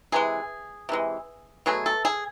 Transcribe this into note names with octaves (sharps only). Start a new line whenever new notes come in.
C3 E3 G#3 G#4
C3 E3 G#3
B2 F#3 A3 G#4
A4
G#4